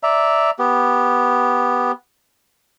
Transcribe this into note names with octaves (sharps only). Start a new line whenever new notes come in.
D5 E5 A#5
B3 G4